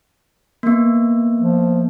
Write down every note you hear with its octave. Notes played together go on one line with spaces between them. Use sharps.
A#3 B3
F3